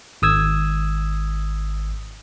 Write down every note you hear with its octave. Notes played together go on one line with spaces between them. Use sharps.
G#1 D#6 E6 G#6